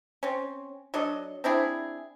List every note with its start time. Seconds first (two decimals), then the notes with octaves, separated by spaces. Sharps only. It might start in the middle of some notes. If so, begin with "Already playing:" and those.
0.23 C4 C#4
0.94 F#3 D4 A4 D#5
1.44 C4 D4 E4 G#4